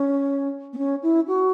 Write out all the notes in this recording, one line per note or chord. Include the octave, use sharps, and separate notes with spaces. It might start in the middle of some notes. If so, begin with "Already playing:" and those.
Already playing: C#4
B3
C#4
E4
F#4